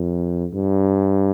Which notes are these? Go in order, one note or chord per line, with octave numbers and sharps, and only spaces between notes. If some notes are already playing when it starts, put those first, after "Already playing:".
Already playing: F2
G2